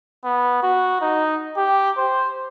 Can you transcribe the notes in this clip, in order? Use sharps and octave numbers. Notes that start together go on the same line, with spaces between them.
B3
F#4
D#4
G4
C5